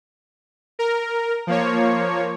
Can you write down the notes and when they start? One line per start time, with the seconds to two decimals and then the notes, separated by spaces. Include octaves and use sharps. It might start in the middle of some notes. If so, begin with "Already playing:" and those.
0.79 A#4
1.47 F3 A#3 C#5